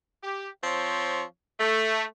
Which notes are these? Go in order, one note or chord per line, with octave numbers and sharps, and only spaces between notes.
G4
F3 C4 C#5
A3